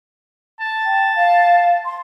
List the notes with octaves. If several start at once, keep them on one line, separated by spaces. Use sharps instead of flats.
A5
G5
F5
C6